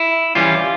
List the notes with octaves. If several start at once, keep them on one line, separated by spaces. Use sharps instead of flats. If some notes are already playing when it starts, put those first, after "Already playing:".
Already playing: E4
E3 G3 C#4 F4